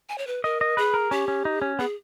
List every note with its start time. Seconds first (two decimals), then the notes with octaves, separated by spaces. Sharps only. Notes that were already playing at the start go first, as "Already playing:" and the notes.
0.09 G#5
0.18 C#5
0.27 B4
0.44 A#4 D#5
0.61 D#5
0.77 G#4 B4
0.94 A#4
1.11 C#4 G4
1.28 C#4
1.45 D#4
1.62 C#4
1.79 B3 G#4